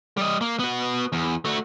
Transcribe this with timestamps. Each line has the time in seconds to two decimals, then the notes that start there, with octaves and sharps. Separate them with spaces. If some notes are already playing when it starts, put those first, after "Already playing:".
0.17 G3 D#5
0.41 A#3
0.59 B3 F#4
1.13 E2
1.45 A3 F#4